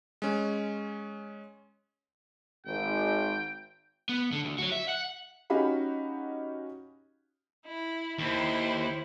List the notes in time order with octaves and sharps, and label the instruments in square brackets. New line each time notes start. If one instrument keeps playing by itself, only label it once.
[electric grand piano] G#3 C#4
[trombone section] G#1 [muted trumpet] G5
[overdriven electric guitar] B3
D3
D2
F#4 C#5
E5
F#5
[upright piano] C#4 D#4 F#4 G4 F5 B5
[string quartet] E4
[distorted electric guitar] D#2 [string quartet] E4 C5